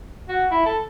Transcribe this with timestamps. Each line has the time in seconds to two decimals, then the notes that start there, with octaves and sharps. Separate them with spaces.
0.29 F#4
0.51 E4
0.66 A4